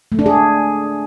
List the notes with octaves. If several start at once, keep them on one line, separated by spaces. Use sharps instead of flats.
A3
D4
G#4